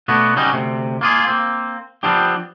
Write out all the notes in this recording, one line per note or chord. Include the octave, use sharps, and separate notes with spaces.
B2 A3 B3 D4 F#4
C#3 F#3 G3 C#4 D#4
D2 C3
A#3 F4 G#4
A#3 C4
F3 G3 B3 C4 D4 G4